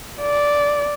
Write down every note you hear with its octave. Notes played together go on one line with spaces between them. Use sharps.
D5